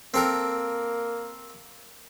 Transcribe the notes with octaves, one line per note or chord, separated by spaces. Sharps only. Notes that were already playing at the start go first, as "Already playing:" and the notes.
A#3 C4 A4 A#4